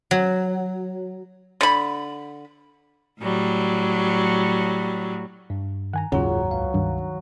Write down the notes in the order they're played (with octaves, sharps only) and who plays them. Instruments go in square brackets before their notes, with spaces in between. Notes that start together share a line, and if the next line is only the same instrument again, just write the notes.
[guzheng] F#3
[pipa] D3 B5
[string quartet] A2 F#3 G3
[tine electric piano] G2
[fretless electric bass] D#3 [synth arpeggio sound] F#5 G#5 A#5
[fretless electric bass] F#1 D#2 G#2 [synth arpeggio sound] C#3 [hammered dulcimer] F#3 [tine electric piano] F4 G#4
[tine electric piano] C#2 F5
[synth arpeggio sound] G2 [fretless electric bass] D#3